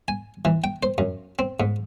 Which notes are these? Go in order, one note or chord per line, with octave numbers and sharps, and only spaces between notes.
G#5
E3
G5
C5
F#2
C4
G#2